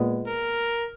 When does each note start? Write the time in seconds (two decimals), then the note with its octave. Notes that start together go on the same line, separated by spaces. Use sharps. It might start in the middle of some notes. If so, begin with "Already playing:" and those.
Already playing: A#2 G#3 B3
0.28 A#4